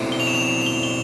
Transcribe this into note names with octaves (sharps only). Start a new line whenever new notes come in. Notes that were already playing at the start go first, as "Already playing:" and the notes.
Already playing: B2 A3 C4 E4
G7
F7
E7
F7
E7
F7
G7
G7